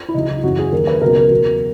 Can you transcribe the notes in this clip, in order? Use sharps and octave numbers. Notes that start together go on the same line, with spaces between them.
E4
C#2 C#3 F#3 D#4
E4
F#2 C#3 E3 F#4
G#4
D#2 D#3 F#3 A#4
B4
C#2 B2 F#3 A#4
A#4
E2 B2 F#3